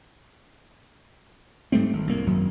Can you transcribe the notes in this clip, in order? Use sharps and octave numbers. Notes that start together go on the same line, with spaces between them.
G#2 G3 A3 C4
G#1
C2 A#3
G#1 F#2 F#3